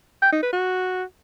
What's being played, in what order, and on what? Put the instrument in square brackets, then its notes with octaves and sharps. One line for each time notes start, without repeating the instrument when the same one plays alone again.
[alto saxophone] G5
D#4
B4
F#4